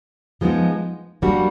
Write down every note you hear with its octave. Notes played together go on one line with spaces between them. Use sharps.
F3 G#3 B3 D#4
G3 A#3 D4 F#4